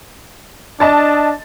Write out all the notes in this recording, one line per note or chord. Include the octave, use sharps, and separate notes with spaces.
D4 D#5 A5 A6